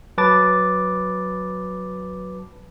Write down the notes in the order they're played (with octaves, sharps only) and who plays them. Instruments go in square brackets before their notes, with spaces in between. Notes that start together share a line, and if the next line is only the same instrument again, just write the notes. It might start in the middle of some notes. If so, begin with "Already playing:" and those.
[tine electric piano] F#3 B4 A5 D6 A6